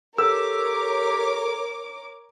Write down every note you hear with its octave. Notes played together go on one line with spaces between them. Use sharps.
G4 A4 A#4 C#5 D6 E6